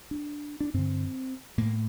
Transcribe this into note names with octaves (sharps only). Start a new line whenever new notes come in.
D4
D4
G2 D3 C4
A2 A#3